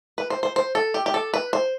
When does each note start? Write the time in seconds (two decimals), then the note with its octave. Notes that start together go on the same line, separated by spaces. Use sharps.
0.18 B4
0.30 C5
0.43 C5
0.56 C5
0.75 A4
0.94 G4
1.06 G4
1.14 A4
1.34 B4
1.53 C5